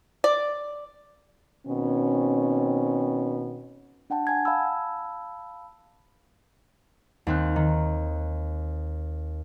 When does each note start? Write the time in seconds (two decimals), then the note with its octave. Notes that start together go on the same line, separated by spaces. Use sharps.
0.24 D5
1.67 B2 D#3 C4 C#4
4.10 D4 F#5 G5 A5
4.27 F#5 G#5 G#6
4.45 F5 A5 B5 E6
7.27 D#2 C4 F#6
7.56 D#3